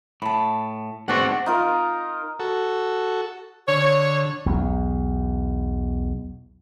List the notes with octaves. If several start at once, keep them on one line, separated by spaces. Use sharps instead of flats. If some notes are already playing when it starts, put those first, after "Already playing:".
A2 A5 B5
E2 G#2 C4 D4 F#4 F#5
D#4 F4 A#4
F#4 A4
D3 C#5
B1 E2